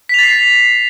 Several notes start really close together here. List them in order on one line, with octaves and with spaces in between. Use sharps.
B6 F7 A6 C7